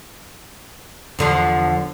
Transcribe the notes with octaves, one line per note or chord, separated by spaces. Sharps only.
E2 D3 F3